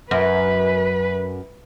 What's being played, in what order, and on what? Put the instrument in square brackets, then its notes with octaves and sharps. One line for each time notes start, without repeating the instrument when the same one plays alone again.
[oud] F#2 [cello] B4